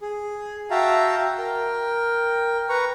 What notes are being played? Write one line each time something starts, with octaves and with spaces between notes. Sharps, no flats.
G#4
F#4 E5 F5 G5 A5 A#5
A#4 G5
B4 A#5 C#6